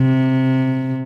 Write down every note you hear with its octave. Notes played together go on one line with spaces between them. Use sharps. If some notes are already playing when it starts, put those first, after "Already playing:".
Already playing: C3